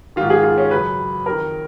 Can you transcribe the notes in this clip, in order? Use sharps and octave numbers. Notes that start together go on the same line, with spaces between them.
G#2 D#3 F4
G#4
F4
C#4
F#2 C#3 B4
F2 D#3 A#4